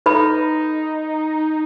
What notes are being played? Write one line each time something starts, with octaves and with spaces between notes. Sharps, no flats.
D#4 A4 B4 B5